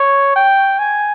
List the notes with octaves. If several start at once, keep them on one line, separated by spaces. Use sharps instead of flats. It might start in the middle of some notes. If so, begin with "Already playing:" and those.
Already playing: C#5
G5
G#5